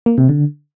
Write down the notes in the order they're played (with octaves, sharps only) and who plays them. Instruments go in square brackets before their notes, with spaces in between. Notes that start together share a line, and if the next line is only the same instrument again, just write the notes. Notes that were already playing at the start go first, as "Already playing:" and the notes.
[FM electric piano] A#3
C3
D3